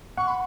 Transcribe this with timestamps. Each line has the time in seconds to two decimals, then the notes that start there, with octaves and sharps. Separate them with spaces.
0.18 F#5 C#6
0.28 B5